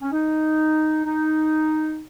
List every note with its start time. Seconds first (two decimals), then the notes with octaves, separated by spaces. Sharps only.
0.02 C#4
0.11 D#4
1.05 D#4